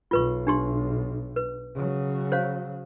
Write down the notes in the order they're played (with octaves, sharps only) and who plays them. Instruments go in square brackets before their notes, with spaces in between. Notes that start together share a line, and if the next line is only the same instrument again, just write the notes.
[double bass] B1 [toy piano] F4 B4 C#6
[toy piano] D4 G4 C6
B4
[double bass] C#3 F#3
[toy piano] C5 C#5 F5